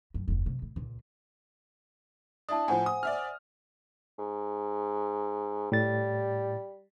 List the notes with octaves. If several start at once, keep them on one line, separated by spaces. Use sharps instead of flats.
F#2
F1 D2
F#2 C3
A2
C#2 A#2
D4 E4 A5 D#6
A2 F3 C5 F#5 G#5
D#6
D5 E5 F6
G#2
A2 G3 A6